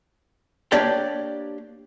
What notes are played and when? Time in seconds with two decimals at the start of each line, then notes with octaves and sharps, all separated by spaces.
0.72 A#3 D4 G4 C#5 D5 G5